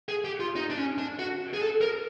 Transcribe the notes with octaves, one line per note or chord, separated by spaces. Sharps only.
G#4
G4
F4
D#4
D4
C#4
D4
F#4
G#4
A4
A#4